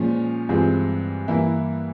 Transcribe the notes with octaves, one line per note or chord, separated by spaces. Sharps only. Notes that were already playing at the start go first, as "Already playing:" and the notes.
Already playing: A#2 F3 G#3 C#4
G2 E3 G#3 C4 F4
G2 E3 A#3 E4